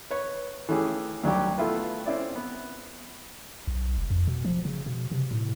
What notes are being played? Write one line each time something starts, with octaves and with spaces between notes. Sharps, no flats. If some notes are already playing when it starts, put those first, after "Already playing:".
B4 C#5
E3 A3 C#4 G4 G#4
D2 F#3 G3 G4
A3 B3 E4 F4 B4
C4 C#4 E4 D5
B3
B1
F1
F2
B2
F3
C#3
B2
C3
A2